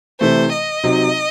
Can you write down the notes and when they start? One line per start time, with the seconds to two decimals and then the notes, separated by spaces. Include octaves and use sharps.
0.21 C3 E3 A3 C5
0.52 D#5
0.84 C3 F#3 C4 D#4